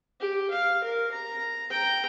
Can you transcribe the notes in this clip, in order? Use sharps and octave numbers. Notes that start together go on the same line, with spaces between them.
G4
F5
A#4
A#5
G5 A#5